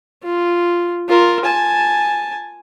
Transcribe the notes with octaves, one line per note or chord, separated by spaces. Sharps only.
F4
F4 A#4
G#5 A5